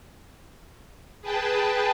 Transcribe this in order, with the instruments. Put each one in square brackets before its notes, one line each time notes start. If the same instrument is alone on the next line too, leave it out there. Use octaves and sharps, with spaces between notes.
[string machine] G#4 B4 G5 A5